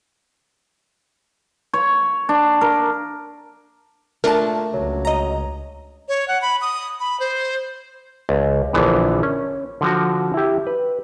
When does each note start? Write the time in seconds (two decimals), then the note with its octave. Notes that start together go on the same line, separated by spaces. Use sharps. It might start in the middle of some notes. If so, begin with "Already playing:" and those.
1.73 C#5
2.29 D4
2.61 A#4
4.24 A#2 A3 D4 A#4 A5
4.74 C#2 F#3
5.05 D#5 A#5
6.08 C#5
6.28 F#5
6.42 B5
6.61 D#6
7.00 B5
7.20 C5
8.29 C#2
8.73 A#1 D3 E3 B3
9.23 C#4
9.81 D3 F3 F#4
10.34 E4 G4
10.67 B4